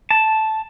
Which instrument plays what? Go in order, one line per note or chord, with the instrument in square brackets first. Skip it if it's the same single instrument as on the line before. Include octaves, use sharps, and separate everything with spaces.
[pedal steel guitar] A5